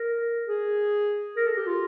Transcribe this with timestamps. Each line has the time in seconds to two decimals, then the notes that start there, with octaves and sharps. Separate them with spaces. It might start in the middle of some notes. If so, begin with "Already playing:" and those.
Already playing: A#4
0.47 G#4
1.36 A#4
1.47 A4
1.57 G4
1.67 F4